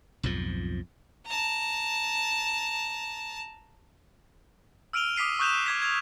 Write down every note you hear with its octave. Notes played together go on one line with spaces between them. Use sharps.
B1 F2 G#2 F3
A5 A#5
E6 F6 D7 D#7 F7 G7
D6 D#6 B6 C7 D#7
C#6 D#6 F#6 G6 E7 F7
D6 G#6 B6
G#6 F7